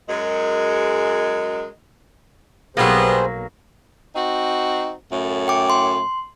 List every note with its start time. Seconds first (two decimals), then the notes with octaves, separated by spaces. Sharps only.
0.08 F#2 G#3
2.77 B1 F#3 G3 A#3 B3 G#4 C5
4.16 C4 D#4 F#4
5.12 F#2 A2
5.48 G5 D6
5.70 C6